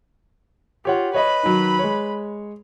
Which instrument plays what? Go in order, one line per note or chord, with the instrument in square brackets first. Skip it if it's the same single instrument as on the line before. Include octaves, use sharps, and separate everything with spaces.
[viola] F4 [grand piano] G4 C#5 F#5
[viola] B4 B5 [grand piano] C#5 D#5
[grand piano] D#3 F#3
G#3 C#5